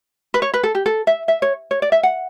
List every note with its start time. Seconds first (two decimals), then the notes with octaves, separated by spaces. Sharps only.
0.34 B4
0.42 C#5
0.54 B4
0.63 A4
0.75 G4
0.86 A4
1.07 E5
1.28 E5
1.42 C#5
1.71 C#5
1.82 D5
1.92 E5
2.03 F#5